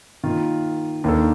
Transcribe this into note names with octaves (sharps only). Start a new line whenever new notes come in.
D#3 A#3 F4
D#2 D#3 A#3 D4 A4